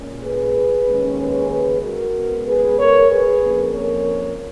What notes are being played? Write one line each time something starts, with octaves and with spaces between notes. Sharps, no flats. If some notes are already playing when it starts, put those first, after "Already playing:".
Already playing: A#2 G#3 C#4
G#4 B4
D#2 C#3 G#3 C#4
G#4 B4
G#4 B4
F#4 A#4
C#3 G#3 B3
G#4 B4
A#4 C#5
G#4 B4
F2 F3 A#3 C#4
A#4 C#5